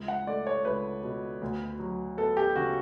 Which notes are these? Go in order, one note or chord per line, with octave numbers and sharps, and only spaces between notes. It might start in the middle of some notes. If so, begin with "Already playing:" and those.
Already playing: C#2
F#5
A3 D5
C#5
C#2 B4
B2
D2
F#3
B3 A4
G4
C#3 F#4